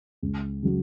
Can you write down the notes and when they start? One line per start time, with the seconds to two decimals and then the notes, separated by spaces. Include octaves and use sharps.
0.22 C#2
0.63 C#3 F#3